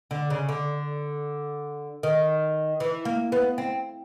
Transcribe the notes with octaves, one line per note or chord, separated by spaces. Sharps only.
D3
C#3
D3
D#3
E3
A#3
B3
C4